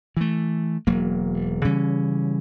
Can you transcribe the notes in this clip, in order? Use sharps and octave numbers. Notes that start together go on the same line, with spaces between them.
E3 A3
E1 F#3 A#3
C#3 E3 G3 C#4